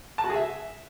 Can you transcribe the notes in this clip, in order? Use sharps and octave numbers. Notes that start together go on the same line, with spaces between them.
A5
F#4
G#4
E5